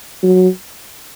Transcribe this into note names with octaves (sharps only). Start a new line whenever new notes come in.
F#3